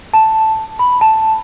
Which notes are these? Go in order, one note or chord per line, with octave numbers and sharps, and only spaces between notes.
A5
B5
A5